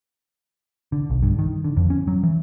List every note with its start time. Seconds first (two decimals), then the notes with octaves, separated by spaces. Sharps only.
0.92 D3
1.10 B1
1.23 G2
1.39 D#3
1.64 D3
1.77 F2
1.90 C#4
2.08 F#3
2.23 E3